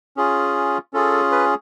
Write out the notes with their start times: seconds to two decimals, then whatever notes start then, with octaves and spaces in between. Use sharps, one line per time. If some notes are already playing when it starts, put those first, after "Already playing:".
0.17 C#4 F4 G#4
0.93 C#4 F4 G#4 A4
1.32 B4